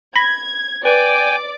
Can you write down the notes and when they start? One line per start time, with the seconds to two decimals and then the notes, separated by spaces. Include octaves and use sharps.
0.16 B5 G#6 A#6 B6
0.85 B4 D5 G5 G#5 D6